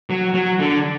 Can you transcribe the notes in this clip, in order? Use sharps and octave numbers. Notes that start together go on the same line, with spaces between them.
F#3
F#3
D3